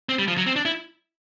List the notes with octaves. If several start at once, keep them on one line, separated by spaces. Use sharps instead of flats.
C4
G3
F3
F#3
C4
D4
E4